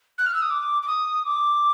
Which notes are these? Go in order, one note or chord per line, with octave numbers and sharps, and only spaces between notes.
F#6
F6
E6
D#6
D6
D6
D#6
D6